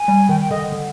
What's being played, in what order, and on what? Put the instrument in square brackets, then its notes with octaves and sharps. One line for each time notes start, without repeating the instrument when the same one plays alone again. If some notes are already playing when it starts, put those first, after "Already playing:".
Already playing: [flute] G#5
[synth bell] G3
[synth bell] D#3 [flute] G5
[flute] G5
[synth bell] D3 [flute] D#5
[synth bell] D3